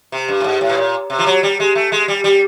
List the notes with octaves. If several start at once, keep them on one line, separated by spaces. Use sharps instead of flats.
C3
G2
A2
G#2
A2
B2
A#2
C3
F3
F#3
G3
G#3
A3
G#3
G3
G3